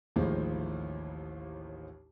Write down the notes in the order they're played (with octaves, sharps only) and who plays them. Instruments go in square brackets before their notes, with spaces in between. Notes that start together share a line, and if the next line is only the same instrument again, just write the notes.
[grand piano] A1 D#2 A2 D#3 F3 G#3